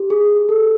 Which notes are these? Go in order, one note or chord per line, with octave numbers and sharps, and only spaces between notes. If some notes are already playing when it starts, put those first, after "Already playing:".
Already playing: G4
G#4
A4